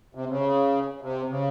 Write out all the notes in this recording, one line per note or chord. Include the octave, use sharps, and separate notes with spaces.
C3
C#3
C3
C#3